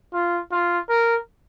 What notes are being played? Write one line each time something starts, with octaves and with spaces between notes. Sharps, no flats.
F4
F4
A#4